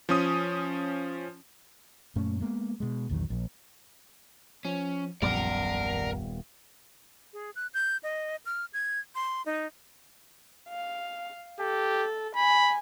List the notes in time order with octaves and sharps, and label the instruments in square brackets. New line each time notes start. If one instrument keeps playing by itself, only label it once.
[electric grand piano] F3 C#4 D#6
[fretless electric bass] F#2 A#2 A3 C#4
G#3 A#3 B3
B2 G#3
A#1 E2 D#3 F#3
A#1
[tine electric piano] F3 [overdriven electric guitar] C#4
[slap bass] D#1 G3 B3 [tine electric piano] A#1 F#2 [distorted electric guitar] A#4 [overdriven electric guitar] D5 F#5
[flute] G#4
F#6
G6
D#5
F6
G#6
C6
D#4
[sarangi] F5
[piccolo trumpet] G4 [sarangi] A4
[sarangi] G#5 [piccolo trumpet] B5